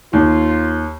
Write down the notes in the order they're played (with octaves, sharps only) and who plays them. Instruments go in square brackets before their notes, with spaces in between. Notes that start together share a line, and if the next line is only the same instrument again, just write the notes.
[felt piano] D#2 [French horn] F4